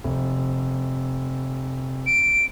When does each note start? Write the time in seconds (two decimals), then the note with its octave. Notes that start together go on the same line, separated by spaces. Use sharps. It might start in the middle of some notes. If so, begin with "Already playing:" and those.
0.04 F1
2.07 D7